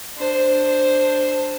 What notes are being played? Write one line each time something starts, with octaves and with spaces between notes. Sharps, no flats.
D4 C5